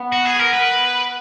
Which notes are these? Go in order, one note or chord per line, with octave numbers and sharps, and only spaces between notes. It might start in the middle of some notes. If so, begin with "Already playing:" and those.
Already playing: B3
F#4
G#4
A#4
B4